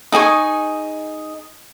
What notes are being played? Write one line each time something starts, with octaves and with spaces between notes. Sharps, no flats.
D#4 G#4 G#5 C#6